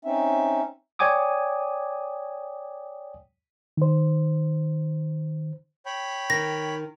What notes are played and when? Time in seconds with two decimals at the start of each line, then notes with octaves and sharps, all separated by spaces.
0.05 C4 C#4 D#4 E5
0.99 C#5 D5 G5 G#5 D6 D#6
3.77 D#3 C5
5.86 C#5 G5 B5
6.30 D#3 A#6